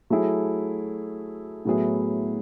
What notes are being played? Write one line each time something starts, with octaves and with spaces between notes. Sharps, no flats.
F#3 A3 E4 G#4
A2 F#3 B3 E4 G#4